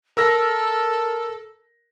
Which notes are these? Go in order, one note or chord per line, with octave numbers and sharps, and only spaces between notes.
A4 A#4 E6 A#6